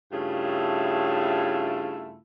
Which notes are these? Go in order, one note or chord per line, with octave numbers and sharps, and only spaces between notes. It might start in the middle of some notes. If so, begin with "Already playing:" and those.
G2 C#3 A3 E4 F4